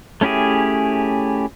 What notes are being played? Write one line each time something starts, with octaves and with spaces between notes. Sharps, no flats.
A3 C#4 E4 G4 G#4